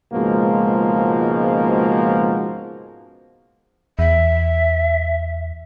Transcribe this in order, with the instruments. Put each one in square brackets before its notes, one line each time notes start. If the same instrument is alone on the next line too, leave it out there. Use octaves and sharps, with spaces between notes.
[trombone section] C#2 G#2 B2 F3 A#3 F#4
[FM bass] E2 [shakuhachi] E5